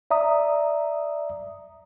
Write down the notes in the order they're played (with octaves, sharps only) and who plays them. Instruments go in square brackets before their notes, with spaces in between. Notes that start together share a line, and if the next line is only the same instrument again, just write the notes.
[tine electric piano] D5 E5 A#5 D#6